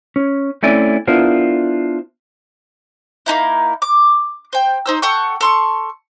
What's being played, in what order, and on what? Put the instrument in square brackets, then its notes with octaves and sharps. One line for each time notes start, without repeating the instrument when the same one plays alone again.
[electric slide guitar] C#4
A3 C4 C#4 E4 D5 G#5
B3 D4 E4 F4 A#4 C5
[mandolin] A#3 C#4 D#4 E4
D6
C5 G5
D#4 C5 E6
A4 F#5 G5 C#6
A4 C6 C#6